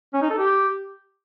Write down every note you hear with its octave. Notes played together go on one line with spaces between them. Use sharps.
C#4
D#4
A4
G4